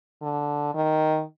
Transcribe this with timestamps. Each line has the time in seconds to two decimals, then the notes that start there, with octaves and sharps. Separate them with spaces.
0.22 D3
0.75 D#3